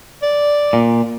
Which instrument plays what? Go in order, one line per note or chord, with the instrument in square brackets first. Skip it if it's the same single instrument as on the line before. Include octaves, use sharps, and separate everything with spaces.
[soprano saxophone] D5
[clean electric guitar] A#2